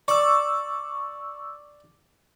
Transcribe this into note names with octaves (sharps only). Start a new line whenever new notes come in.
D5 C#6 E6